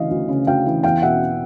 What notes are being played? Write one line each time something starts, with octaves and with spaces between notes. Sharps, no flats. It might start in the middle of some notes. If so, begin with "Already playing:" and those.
Already playing: D2 C#3 E3 D#5 F5
D2
C#3
D2 F5 G5
E3
E2 F5 G5
B2 E5 F#5